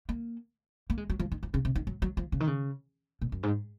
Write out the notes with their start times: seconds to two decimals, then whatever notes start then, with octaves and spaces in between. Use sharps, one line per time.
0.09 A#3
0.90 A#3
0.97 G#3
1.10 F#3
1.19 F3
1.32 D#3
1.43 F3
1.54 C#3
1.65 C3
1.75 D#3
1.87 F#3
2.02 F#3
2.17 F3
2.32 C#3
2.40 D#3
2.47 C#3
3.22 A#2
3.32 F#2
3.43 G#2